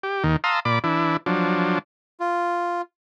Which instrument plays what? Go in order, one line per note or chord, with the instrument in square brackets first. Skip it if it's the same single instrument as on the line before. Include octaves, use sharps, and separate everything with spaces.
[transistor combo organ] G4
D#2 D#3
F5 A5 A#5 C6 D#6 E6
A#2 D5 B5 D6
E3 D4 E4
F3 F#3 D4
[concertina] F4